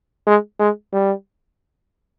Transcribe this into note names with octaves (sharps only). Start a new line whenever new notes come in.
G#3
G#3
G3